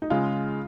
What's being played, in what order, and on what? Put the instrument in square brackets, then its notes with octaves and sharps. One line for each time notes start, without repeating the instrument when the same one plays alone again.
[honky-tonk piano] D#4
[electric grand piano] C#3 G#3 [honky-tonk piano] F4